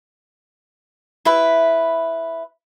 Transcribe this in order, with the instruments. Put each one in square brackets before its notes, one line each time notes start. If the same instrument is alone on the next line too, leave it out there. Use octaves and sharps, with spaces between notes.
[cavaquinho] E4 B4 E5